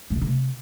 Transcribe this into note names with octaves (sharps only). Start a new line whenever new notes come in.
G2
B2
D3
C3